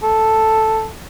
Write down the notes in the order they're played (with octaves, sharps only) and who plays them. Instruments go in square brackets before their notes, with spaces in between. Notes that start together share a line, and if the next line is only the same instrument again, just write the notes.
[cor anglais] A4